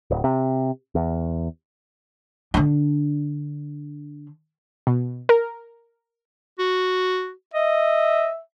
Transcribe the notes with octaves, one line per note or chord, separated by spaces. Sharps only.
D1
C3
E2
D3 D4
B2
A#4
F#4
D#5 E5